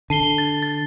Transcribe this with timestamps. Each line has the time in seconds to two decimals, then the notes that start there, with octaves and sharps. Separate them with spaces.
0.10 D3 A5 C7 G7
0.38 A6
0.63 A6